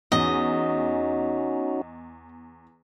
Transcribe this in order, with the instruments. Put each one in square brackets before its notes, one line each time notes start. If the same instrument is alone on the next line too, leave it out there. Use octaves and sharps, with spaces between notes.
[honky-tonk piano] E2 [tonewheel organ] C#4 D#4 F#4 [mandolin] D#5